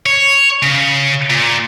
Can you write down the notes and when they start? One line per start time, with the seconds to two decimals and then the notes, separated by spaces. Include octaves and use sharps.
0.06 C#5
0.62 C#3
1.30 A#2